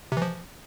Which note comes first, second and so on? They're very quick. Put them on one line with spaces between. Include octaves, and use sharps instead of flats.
C3 E3 F3